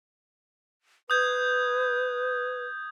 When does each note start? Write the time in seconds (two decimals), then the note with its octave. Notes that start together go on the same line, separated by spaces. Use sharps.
1.10 B4 D#6 G6 G#6